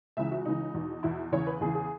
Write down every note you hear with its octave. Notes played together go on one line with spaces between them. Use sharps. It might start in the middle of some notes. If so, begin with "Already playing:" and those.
C#2 C#3 E3 E5
F#4
C#2 C#3 E3 D#4
E2 B2
E2 B2 E4
E2 C#3 E3 C#5
B4
E2 C#3 E3 G#4
G#4